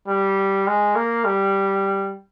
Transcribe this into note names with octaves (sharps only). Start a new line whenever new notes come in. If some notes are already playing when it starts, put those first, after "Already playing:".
G3
G#3
A#3
G3